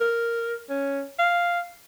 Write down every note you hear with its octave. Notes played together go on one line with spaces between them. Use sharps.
A#4
C#4
F5